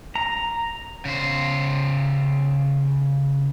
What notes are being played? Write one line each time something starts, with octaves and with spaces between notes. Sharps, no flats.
A#5
C#3 C5